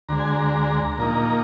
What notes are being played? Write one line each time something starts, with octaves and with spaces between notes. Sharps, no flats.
D2 D3 G#3 A#5
G#5
A#5
A#2 F3 A#3 D#4